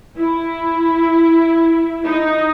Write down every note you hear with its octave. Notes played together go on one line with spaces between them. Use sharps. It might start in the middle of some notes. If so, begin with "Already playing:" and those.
E4
D#4